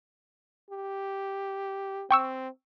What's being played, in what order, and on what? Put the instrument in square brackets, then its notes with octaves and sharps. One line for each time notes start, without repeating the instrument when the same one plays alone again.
[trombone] G4
[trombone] C4 [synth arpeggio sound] G5 C#6 E6